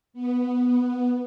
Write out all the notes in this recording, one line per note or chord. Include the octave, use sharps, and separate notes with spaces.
B3